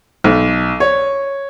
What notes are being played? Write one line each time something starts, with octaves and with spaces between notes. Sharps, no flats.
B1
C#5